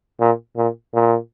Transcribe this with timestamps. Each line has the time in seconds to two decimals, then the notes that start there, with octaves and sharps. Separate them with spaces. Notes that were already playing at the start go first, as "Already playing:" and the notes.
0.20 A#2
0.57 A#2
0.94 A#2